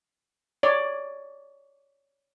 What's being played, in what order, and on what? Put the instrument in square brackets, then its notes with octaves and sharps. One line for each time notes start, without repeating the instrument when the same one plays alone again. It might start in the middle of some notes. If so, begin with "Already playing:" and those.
[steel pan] C#5 D5